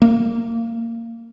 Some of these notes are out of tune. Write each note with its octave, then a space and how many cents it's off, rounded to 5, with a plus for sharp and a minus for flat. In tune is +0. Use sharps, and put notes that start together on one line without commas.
A#3 -20